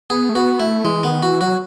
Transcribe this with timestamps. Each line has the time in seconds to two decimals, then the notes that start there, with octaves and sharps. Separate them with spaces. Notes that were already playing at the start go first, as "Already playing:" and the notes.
0.10 B3 G#4
0.29 A3
0.35 B3 F#4
0.60 A3 E4
0.84 E3 G#3
1.03 D#3 B3
1.23 E3 F#4
1.41 F#3 F#4